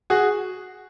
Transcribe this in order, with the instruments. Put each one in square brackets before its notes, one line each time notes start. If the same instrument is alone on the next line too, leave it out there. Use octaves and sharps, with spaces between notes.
[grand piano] F#4 G#4